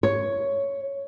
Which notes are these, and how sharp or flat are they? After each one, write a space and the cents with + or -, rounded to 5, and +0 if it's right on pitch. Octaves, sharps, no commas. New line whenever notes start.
C#5 +5